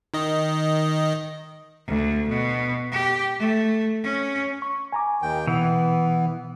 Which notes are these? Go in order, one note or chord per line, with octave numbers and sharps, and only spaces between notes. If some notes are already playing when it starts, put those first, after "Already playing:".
D#3 D#5
D2
B2
G4
A3
C#4
C#6
G#5 A#5 D6
D#2 D#3 G5
B2 E3 B3